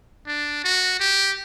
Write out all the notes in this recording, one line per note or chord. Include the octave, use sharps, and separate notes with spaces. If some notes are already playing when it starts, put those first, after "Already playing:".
D4
F#4
G4